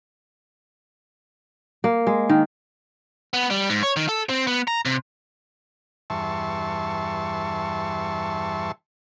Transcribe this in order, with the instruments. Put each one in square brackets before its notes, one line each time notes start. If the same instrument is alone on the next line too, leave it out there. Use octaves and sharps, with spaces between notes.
[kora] A#3
G#3
D#3
[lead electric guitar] B3
G3
G#2
C#5
D#3
A4
C4
B3
A#5
C3
[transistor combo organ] E2 G2 E5 A5 C6 C#6